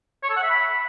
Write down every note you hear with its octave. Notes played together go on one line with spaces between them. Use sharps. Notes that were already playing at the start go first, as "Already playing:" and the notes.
C#5
A4
F#5
E5
B5